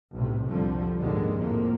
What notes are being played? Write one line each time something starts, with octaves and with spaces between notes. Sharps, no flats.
B1 A2 C3
C2 F2 D3 F3 G3
D#2 G#2 D3 G#3 A#3
F2 A2 F3 A#3